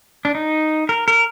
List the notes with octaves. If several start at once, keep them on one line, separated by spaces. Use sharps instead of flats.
D4
D#4
A#4
A#4